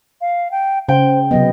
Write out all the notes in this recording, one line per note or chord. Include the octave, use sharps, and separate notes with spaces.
F5
G5
C#3 C5 G5
C3 F#3 B3 D#5